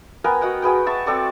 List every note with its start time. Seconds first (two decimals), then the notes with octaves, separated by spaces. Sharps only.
0.24 B3 A#4 G5 G#5
0.41 F#4 D#5 F#5 G5
0.62 F#4 G#4 B4 G5
0.86 E5 A5 C#6
1.06 C4 A4 D5 C#6